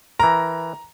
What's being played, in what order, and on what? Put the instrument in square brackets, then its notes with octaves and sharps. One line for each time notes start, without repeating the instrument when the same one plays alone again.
[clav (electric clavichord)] E3 A#4 [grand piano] A#5